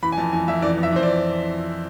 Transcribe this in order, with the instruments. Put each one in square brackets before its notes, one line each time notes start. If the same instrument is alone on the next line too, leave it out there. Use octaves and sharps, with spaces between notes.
[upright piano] E3 B5
G#5
F2 A5
E3 G#5
F2 E5
E3 D5
F2
E5
E3 C5
D5